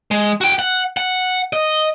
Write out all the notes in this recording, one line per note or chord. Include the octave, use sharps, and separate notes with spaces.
G#3
F#4 G5
F#5
F#5
D#5